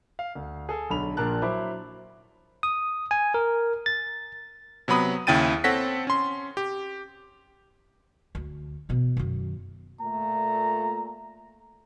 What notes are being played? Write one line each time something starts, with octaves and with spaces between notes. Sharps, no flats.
F5
D2
G#4 A4
B1 D3 B5 F7
A#1 A#2 D4 A#4 A5 F#6
F#3 E4 C5 B5 D6
D#6
G#5
A#4
A6
C3 F#3 B3 B5 D#6
D#2 C#3 E4 G5 A6 D#7
C4 A4 C#5 F#5 A#6 B6
C#4 C6
G4
D2
B2 E3
F#2 D#3
A#2 A3 A#5